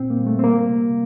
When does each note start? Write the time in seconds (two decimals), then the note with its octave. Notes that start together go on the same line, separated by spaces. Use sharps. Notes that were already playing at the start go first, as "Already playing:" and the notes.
Already playing: A#2 C4
0.10 A#3
0.19 G3
0.27 A3
0.39 C4
0.43 G3 A#3
0.68 C3